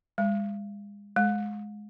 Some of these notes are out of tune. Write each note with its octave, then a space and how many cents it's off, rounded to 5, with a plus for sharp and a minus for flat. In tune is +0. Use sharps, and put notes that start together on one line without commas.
G#3 -35
G#3 +15